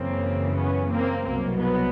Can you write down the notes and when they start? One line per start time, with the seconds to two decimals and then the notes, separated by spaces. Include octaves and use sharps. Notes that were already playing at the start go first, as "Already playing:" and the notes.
Already playing: F#2 C#3 E3 A#3 C4
0.56 B3 C#4
0.91 A#3 C4
1.25 C2 B2 F#3 A#3
1.59 B3